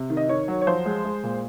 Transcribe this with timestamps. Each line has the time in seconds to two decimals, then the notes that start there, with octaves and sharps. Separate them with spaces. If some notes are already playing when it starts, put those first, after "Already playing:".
Already playing: C3
0.10 D#3
0.17 D#5
0.29 D#3 C#5
0.48 F#3
0.61 C#5
0.67 F3 C5
0.86 G#3
1.05 G#3
1.23 A#2